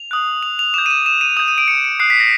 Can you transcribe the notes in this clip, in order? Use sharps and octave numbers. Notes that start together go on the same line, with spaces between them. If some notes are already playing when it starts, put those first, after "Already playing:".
Already playing: F7
D#6 F#6
F7
F7
D6 G6 E7
D#7
E7
E7
D#7
D#6 G6 E7
D#7
D7
C#7
C#7
D#6 F#6 C7
B6
A#6